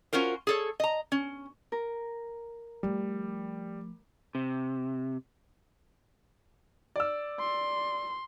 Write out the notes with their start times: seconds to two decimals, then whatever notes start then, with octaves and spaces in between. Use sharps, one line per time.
0.13 C#4 F4 F#4 A#4 C5
0.47 G#4 A4 C#5
0.80 D#5 A#5
1.12 C#4
1.72 A#4
2.83 F3 G3 A3
4.35 C3
6.96 D5 E6
7.40 C6